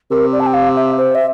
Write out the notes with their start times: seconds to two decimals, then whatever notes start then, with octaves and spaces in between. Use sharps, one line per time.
0.11 C3 A#4
0.32 D5
0.40 A5
0.46 G5
0.54 F5
0.76 E5
0.97 C5
1.15 E5